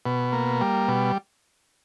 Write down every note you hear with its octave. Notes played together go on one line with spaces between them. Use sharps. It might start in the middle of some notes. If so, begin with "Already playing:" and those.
B2
A#3
G3
B2